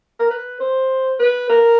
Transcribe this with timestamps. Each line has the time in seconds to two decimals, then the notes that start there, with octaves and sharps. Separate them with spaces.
0.20 A#4
0.30 B4
0.60 C5
1.20 B4
1.50 A#4